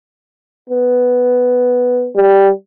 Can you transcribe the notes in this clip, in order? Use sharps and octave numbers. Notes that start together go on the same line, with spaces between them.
B3
G3